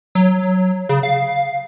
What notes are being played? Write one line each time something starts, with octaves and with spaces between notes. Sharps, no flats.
F#3
C#3
F5